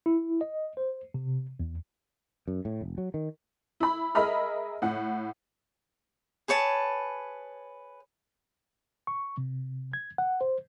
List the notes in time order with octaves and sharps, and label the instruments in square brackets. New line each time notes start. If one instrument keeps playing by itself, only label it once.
[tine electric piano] E4
D#5
C5
C3
E2
[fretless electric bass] F#2
A2
F1
F#3
D#3
[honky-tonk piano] E4 B5
G#4 A#4 D#5 E5 B5 F6
A2 F#5
[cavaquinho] G#4 B4 C#5 A5
[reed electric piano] C#6
C3
G#6
F#5
C5